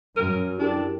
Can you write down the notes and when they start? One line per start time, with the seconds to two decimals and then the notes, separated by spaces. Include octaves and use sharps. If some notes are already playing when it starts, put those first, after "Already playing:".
0.16 F#2 F#3 A#4 D#7
0.59 D4 E4 G4 A4 A#4